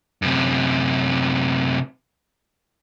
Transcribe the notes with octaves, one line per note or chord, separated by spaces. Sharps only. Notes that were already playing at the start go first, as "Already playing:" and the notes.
F#2 C3